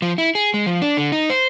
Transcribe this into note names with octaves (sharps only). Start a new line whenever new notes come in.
F3
E4
G#4
G#3
F3
D4
D3
D#4
C5